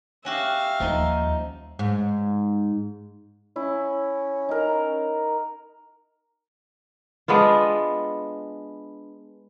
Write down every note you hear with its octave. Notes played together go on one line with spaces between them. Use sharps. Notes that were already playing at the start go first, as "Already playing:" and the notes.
C#4 F#4 G4 E5 F5
D#2 F3 G3 D#4
G#2
C#4 E4
D#4 A#4
G#3 B3 D4 F4